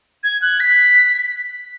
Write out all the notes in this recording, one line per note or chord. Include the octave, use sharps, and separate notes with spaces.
G#6
F#6
B6